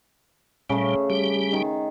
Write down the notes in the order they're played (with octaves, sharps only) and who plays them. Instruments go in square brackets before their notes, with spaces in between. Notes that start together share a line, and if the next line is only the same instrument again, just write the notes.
[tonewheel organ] A#2 G3 [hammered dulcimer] C#3 A3
[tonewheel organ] G3 G4
[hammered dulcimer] D#3